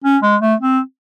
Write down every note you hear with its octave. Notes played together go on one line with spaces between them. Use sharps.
C#4
G#3
A3
C4